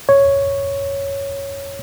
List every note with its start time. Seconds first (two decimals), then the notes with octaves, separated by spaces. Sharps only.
0.09 C#5